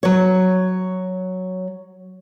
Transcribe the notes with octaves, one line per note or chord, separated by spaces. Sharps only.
F#3 C#5